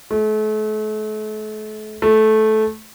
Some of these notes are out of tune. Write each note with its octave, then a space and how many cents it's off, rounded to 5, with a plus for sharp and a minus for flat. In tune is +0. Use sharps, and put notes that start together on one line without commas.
A3 -40
A3 -15